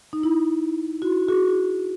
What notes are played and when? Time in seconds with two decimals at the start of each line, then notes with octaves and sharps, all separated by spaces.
0.13 D#4
0.23 E4
1.02 E4 F#4
1.28 F#4 G#4